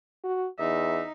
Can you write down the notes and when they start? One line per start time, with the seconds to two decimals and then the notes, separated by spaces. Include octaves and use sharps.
0.24 F#4
0.59 E2 D#4 E5